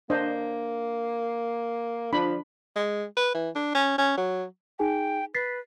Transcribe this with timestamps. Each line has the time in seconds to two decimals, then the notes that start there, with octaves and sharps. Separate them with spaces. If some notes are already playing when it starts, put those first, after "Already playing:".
0.10 A#3 D4 C5 D#5
2.13 F3 D4 B5
2.76 G#3
3.17 B4
3.35 E3
3.55 D4
3.75 C#4
3.98 C#4
4.18 F#3
4.79 D#4 G#4 G5 G#5
5.34 B4 A6 B6 C7